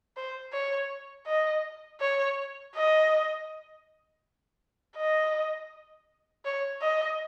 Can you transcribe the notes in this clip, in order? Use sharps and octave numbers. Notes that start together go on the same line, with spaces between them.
C5
C#5
D#5
C#5
D#5
D#5
C#5
D#5